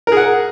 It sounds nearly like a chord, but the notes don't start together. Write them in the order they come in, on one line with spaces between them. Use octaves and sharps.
A#4 G#4 F#5